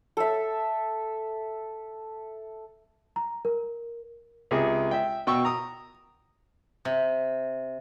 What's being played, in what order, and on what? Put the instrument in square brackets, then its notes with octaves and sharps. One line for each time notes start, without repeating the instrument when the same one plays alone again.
[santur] A4 E5
[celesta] A#5
A#4
[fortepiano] C#2 C3 G#4
E5 G5
B2 G5 C#6 E6
A#5 D#6
[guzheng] C3